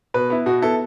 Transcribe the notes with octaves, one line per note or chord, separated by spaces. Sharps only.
B2 B4
B3 E4
B2 F#4
B3 E4 A4